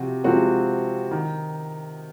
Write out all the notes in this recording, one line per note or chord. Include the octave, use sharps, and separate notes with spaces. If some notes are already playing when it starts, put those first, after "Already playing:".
Already playing: C3 F3 C4 F#4
C3 F3 G#3 C4 F#4
D#3